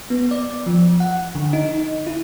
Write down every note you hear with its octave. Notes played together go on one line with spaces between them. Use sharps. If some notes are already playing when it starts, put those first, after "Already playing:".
B3
D5
F3
F#5
D3
D#4
E4